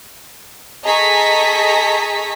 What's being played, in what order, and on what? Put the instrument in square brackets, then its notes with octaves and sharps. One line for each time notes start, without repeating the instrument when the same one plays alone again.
[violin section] G#4 A4 D#5 A#5 C#6 B6